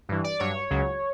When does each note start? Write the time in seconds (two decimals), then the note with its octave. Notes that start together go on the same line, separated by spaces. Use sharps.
0.09 G2 E3
0.24 D5
0.39 G2 F#3 C#5
0.70 C#2 C#3 F#3